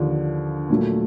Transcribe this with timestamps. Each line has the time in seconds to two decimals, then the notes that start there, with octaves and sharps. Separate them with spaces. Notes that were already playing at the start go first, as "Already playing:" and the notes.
Already playing: D#2 D3 F3
0.69 A#2 F#3 A3